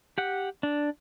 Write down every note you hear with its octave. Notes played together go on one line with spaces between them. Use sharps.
G4 F#5
D4